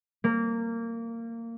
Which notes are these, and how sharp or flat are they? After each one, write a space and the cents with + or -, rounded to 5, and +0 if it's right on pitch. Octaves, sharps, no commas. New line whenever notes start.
A#3 -20